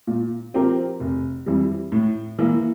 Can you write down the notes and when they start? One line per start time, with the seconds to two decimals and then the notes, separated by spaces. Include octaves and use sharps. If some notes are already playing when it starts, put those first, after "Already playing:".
0.07 A#2
0.54 F3 C4 G4 A#4
1.00 F1
1.46 F2 E3 G3
1.92 A2
2.39 E3 A#3